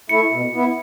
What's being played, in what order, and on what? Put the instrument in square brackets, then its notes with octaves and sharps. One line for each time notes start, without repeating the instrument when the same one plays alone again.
[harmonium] A3 E4 [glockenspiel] C#7
[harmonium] B2
B3 E4